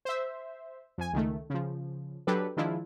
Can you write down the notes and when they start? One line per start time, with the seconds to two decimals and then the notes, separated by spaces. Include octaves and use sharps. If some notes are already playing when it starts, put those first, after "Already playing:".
0.05 C5 E5
0.98 F2 G#5
1.13 C#2 D#3 A3
1.50 C#3 F3
2.27 F#3 D4 G4 A4 B4
2.57 D#3 F3 G#3 D4 E4 F4